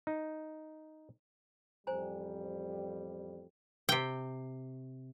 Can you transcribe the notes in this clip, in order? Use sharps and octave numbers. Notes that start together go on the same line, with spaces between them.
D#4
A1 F2 G3 C5 G#5 A#5
C3 G5